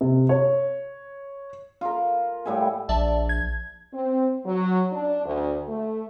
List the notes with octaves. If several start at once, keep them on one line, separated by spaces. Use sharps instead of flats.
C3
C#5
F4 A#4
A2 G3 E5 G#5
A#1 D5 E5 A5
G#6
C4
F#3
D4
D2
A3